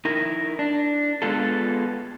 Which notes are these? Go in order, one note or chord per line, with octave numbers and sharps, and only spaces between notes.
D#4 E4 A#4
D4
G#3 B3 F4 A4